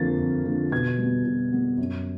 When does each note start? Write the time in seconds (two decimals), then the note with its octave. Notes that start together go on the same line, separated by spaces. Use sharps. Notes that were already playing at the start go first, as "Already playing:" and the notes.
Already playing: F2 D3 F3 A#3 A6
0.19 F2
0.44 D3 F3 A#3
0.72 B2 G#6
0.98 G3 B3
1.25 B2
1.52 G3 B3
1.78 F#2